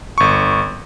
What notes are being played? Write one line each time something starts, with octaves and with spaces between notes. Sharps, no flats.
G1 C#6